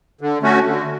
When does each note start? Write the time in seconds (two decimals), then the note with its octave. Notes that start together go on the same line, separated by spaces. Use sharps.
0.21 D3
0.42 A3 C#4 F#4
0.65 D3